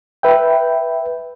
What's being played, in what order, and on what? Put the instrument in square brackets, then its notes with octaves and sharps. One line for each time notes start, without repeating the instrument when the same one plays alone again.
[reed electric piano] B4 E5 G5